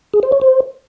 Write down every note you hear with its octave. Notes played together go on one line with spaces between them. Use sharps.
G#4
C5
C#5
C5